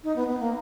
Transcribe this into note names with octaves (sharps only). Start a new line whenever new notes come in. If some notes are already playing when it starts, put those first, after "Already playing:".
D#4
B3
B3
A#3